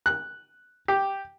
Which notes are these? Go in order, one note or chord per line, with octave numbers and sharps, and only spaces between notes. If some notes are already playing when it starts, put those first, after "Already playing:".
F#6
G4